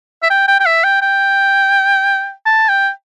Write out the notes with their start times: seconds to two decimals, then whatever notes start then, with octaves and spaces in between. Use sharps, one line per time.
0.23 E5
0.30 G5
0.48 G5
0.60 G5
0.66 E5
0.84 G5
1.02 G5
2.46 A5
2.69 G5